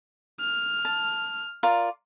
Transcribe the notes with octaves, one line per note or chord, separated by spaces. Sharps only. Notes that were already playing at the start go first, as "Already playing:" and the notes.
F6
A5
F4 A#4 D5